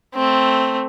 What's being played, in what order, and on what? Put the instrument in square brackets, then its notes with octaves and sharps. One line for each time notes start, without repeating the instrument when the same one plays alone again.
[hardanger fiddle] A3 C4